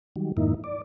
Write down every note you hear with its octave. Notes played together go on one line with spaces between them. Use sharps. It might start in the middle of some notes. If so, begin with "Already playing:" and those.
D#3 F#3 G3
F2 G#2 D#3 A#3 D#4 E4
D5